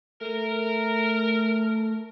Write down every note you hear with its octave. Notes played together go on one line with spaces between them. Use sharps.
A3 A#4